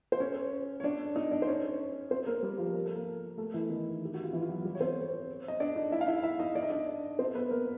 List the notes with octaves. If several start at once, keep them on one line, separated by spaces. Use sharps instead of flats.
C5
C#4 C#5
C#5
D4 D5
D#4 D#5
D4 D5
C5
C#4 C#5
C4 C5
A#3 A#4
G3 G4
F3 F4
A#4
A4
A#3 A#4
A3 A4
E3 E4
D#3 D#4
G4
F#4
F4
E3 E4
F4
F#3 F#4
G3 G4
C#5
C4 C5
D#5
D4 D5
D#4 D#5
E4 E5
F5
E4 E5
E4 E5
D#4 D#5
D5
D#5
D4 D5
C4 C5
B3 B4
A#3 A#4